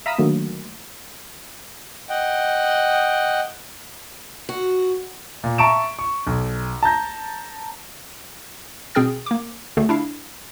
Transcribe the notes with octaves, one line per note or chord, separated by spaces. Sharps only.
E5 F5 A#5 B5 D#6 E6
D3 D#3 F#3 A3 A#3
D#5 F#5 G5
F#4
A#2
E5 A5 A#5 C#6 D7 E7
C#6
B1
A5 A#5 G6 A#6
B2 C4 G#4 G5 F6 A6
A#3 D6
D2 D3 A3 G#4
D4 E4 F5